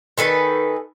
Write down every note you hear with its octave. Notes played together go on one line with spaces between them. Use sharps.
D#3 A4 B4 G#5